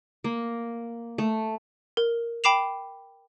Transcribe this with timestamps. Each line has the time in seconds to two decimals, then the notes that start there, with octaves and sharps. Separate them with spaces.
0.24 A#3
1.18 A3
1.97 A#4
2.44 G5 B5 D6 C7 E7 F7